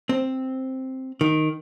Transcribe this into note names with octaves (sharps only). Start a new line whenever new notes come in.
C4
D#3